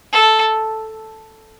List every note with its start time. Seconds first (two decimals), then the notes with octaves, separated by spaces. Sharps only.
0.13 A4